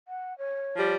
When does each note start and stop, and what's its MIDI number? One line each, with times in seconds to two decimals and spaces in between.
0.08 0.36 78
0.38 0.96 73
0.76 0.95 53
0.76 0.95 55